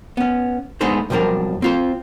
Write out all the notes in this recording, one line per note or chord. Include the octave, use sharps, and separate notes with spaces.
B3 C#4
G#3 A3 B3 D4 D#4 C5
B1 F2 F3 G3 D4 A#4
C4 F4 C5